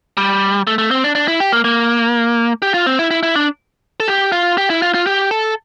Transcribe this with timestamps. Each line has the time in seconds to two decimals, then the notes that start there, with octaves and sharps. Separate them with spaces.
0.17 G3
0.67 A3
0.78 A3
0.91 C4
1.04 D4
1.15 D4
1.28 E4
1.40 G4
1.52 A#3
1.64 A#3
2.62 G4
2.74 F4
2.86 C4
2.99 E4
3.11 E4
3.23 E4
3.36 D4
4.00 A4
4.08 G4
4.32 F4
4.58 G4
4.70 E4
4.82 F4
4.94 F4
5.07 G4
5.31 A4